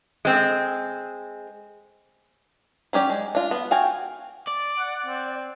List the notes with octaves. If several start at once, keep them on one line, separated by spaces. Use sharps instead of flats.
G#3 C4
F#3 C#4 G4 D5
G#3
D4 F4
B3
F#4 F5 G5 G#5
D5
F#5
C4